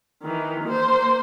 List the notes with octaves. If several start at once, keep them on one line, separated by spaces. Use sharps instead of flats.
D#3 E3
A#3 C5